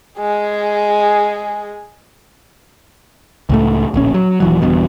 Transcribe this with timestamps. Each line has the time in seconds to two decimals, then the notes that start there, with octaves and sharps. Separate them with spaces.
0.19 G#3 G#4
3.49 C#2 A2 A3
3.94 D1 A#1 C#4
4.14 F#3
4.40 D#1 E3 F#3
4.62 G1 E2 G2 B2